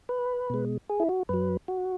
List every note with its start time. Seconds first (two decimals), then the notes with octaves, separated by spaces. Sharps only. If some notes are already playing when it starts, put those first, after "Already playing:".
0.09 B4
0.50 B2 G#3
0.89 G#4
1.00 E4
1.09 F#4
1.29 F#2 F#3 B4
1.68 F#4